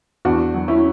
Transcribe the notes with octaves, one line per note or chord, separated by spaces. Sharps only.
E2 D4 F#4
F#3
C#4 E4